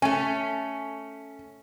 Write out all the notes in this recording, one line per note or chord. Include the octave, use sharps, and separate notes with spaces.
A3 C#4 G#5